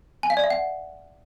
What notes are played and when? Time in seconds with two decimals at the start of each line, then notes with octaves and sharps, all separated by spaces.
0.23 G#5
0.30 F5
0.37 D5
0.44 E5
0.50 F#5